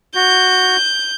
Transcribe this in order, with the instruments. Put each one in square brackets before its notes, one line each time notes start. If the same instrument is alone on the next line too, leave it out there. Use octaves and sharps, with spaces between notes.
[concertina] F#4 [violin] G6